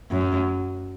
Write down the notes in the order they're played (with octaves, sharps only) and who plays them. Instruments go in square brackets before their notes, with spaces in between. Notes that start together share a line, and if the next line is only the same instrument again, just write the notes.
[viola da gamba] F#2